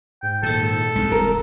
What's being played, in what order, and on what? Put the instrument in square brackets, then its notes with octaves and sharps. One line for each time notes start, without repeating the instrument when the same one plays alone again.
[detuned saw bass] G#2 [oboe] G5
[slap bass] A#2 D#3 [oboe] A4
[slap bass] C2 G2 [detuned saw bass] G#3
[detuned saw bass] E1 [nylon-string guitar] A#4